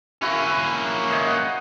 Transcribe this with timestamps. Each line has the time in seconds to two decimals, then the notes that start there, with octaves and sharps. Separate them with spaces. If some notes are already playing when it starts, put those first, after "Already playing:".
0.22 A#3 C#4 E4 F#4 E5
1.10 C5 C#5 D#5
1.27 F#5